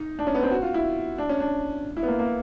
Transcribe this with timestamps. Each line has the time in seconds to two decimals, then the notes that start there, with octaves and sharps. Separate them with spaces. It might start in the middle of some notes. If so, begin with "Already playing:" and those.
Already playing: D#4
0.19 D4
0.27 C#4
0.35 B3
0.43 C4
0.51 F#4
0.62 F4
0.74 E4
1.18 D4
1.29 C#4
1.40 D4
1.97 E4
2.03 B3
2.08 A#3
2.19 A#3